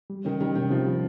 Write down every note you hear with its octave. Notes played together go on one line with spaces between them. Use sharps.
G3
D#3 C#4
D#3 G3
C3 D#3
C3 F3
G3